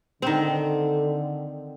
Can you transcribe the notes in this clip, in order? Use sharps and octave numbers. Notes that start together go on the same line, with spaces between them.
D3 D#3 C4